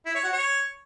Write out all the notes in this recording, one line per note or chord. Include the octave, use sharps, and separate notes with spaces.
E4
C#5
F#4
C#5